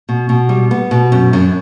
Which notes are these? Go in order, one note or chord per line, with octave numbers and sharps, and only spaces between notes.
B2
B2
G3
B3
B2
F#2
F#2